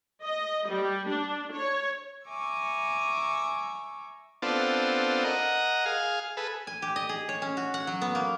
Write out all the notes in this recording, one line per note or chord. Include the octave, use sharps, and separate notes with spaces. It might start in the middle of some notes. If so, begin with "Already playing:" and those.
D#5
G3
D4
C#5
E5 G#5 A#5 C#6 D6 E6
B3 C4 D4 F4 A4
A#4 D#5 F#5
G#4 F5
G#4 A4 B4
G#5
G4
D#5
G#4
C#5
C#4
F#4
F#5
F#3
B3
A#3